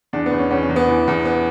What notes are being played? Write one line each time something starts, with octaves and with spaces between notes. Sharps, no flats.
E2 D4
B3
E2
C#4
E2 C#4
C#4
E2
B3
E3
E2
B3